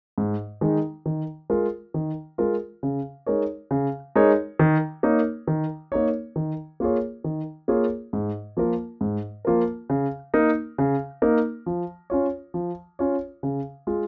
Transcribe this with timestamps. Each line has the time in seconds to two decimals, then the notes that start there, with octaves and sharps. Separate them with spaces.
0.18 G#2
0.61 D#3 G#3 D#4
1.06 D#3
1.50 G#3 F4 A#4
1.94 D#3
2.38 G#3 F4 A#4
2.83 C#3
3.26 G#3 D#4 A#4 C#5
3.71 C#3
4.15 G#3 D#4 A#4 C#5
4.59 D#3
5.03 A#3 D#4 C#5
5.47 D#3
5.92 A#3 D#4 C#5
6.36 D#3
6.80 A#3 F4 G#4 C#5
7.24 D#3
7.68 A#3 F4 G#4 C#5
8.13 G#2
8.57 F3 A#3 F4 A#4
9.01 G#2
9.45 F3 A#3 F4 A#4
9.90 C#3
10.34 A#3 D#4 A#4
10.78 C#3
11.22 A#3 D#4 A#4
11.66 F3
12.10 C#4 F4 C#5
12.54 F3
12.99 C#4 F4 C#5
13.43 C#3
13.87 G#3 F4